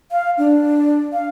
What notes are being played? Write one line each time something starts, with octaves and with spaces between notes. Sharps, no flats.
F5
D4
F5